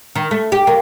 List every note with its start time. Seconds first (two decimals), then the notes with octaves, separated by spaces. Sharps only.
0.15 D#3
0.31 A3
0.52 G4
0.67 A#3